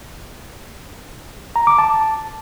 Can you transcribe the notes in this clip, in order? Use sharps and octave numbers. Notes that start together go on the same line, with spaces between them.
A#5
D6
A5